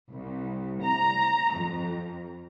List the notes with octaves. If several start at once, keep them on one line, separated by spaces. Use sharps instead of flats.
C2
A#5
F2